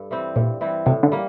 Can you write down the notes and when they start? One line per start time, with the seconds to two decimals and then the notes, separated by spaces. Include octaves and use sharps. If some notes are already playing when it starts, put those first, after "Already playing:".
Already playing: G2 A4
0.11 E3 G3 C4
0.36 G2 A#2
0.61 E3 G3 C4
0.86 A2 C3
1.03 D3
1.12 G3 A#3